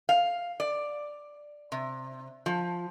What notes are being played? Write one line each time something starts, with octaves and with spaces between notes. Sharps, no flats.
F5
D5
C3
F3